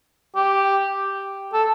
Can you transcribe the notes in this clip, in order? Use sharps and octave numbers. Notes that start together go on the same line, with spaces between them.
G4
A4